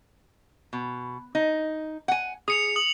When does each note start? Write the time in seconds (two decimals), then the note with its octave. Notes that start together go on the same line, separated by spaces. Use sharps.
0.73 B2
1.35 D#4
2.08 F#5 G#5
2.48 G#4 D#6 C#7 F7
2.76 D#6 F#7